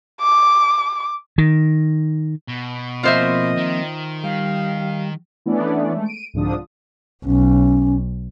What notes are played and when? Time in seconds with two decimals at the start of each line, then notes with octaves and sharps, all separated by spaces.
0.21 D6
1.38 D#3
2.48 B2
3.03 F3 A#3 C4 F4 C5 D#5 E5
3.57 D#3
4.24 G3 F5
5.46 E3 A3 B3 C#4 D4 D5
5.94 G#3 A3
6.06 D7 D#7
6.34 C2 G#2 D3 F3 D4 D#6
7.25 B1 C#4